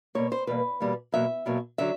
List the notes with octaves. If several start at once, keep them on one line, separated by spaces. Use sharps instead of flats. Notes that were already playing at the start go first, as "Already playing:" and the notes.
B2 G3 A#3 C#5
C5
E2 B2 G3 A#3 B4
E2 B2 G3 A#3
E2 B2 F#3 A#3 E5
E2 B2 F#3 A#3
D3 F#3 E5